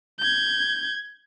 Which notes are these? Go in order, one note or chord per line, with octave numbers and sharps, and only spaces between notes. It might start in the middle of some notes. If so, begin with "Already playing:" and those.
G6 G#6